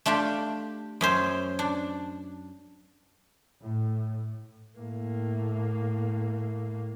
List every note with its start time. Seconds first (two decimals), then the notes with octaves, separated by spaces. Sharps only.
0.06 A3 D4 F4 G4
1.01 F#2 C#4 C5
1.59 D4
3.64 A2
4.79 A2 A#3